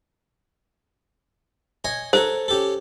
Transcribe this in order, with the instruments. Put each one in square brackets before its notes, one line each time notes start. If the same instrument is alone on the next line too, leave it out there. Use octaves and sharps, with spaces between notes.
[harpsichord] C#5 D#5 G#5
[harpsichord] A4 A#4 C#5 [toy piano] C5
[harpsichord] C#4 G4 A4